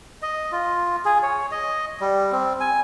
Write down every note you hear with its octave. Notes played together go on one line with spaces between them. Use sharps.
D#5
F4
G#4
C#5
D#5
G3
C4
G#5